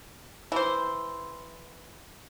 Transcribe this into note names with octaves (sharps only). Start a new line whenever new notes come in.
E3 C5